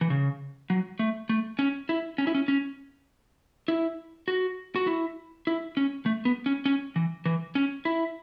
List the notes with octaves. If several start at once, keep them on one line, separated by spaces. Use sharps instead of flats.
E3
C#3
F#3
A3
A3
C#4
E4
C#4
E4
C#4
C#4
E4
F#4
F#4
E4
E4
C#4
A3
B3
C#4
C#4
E3
E3
C#4
E4